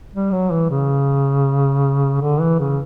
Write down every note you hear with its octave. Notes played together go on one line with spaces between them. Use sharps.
G3
F#3
E3
C#3
D3
E3
C#3